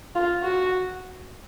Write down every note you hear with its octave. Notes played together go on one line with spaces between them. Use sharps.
F4
F#4